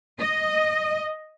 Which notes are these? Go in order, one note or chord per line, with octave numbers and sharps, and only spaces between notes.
D#5